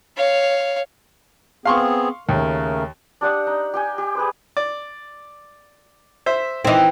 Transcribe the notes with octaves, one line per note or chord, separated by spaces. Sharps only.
C#5 F5
B3 C4 G#4 F5 C6 C#6
D#2 C#3 A3 A#4
D4 G4 F#5 D#6
D#4
G4 G5 G#5
G4
G#4 B4 C5
D5
C5 E5
D#3 E3 C4 D#5